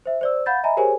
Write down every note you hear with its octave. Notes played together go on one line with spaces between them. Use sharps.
C5 E5
C5 D5 E6
F5 F#5 B5 G6 A6
D#5 E5 G#5 A#5 B5
G4 G#4 A#4 C5 C#5 G#5